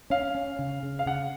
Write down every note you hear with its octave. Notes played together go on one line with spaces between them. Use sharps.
C#4 F5
C#4
C#3
C#3
F5
C#3 F#5